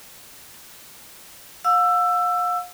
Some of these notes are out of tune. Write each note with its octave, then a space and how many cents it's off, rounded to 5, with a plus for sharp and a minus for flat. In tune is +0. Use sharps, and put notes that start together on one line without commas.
F5 +40 E6 +15